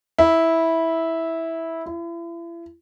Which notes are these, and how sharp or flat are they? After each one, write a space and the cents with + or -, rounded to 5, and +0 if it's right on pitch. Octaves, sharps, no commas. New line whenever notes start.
E4 -10
E4 +40